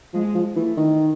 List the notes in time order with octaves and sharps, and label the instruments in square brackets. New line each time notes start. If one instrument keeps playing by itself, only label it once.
[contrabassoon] F3 [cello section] G#3
[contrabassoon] F3
[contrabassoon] E3 [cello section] A3
[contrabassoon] D#3